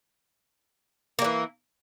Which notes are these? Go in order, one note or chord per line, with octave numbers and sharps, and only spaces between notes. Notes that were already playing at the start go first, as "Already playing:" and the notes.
E3 G3 A#3